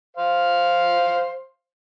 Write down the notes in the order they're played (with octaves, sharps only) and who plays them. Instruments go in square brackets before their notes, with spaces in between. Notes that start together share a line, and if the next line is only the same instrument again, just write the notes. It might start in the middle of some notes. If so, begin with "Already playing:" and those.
[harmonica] C5 F5